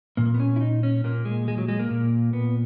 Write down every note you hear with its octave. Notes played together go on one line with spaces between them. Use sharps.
A#2 A#3
B3
C#4
E4
D#4
C#4
A#2 A#3
G#3
G#3
F#3
G#3
A#3
A#2
B3